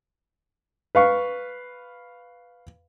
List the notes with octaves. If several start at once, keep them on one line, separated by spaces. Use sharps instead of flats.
B4 F5 C#6